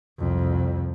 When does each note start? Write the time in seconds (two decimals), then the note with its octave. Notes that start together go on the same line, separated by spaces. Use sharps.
0.19 C2 F2